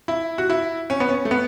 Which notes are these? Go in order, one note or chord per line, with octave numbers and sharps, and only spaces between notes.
E4
F#4
E4
C#4
B3
C#4
A3
B3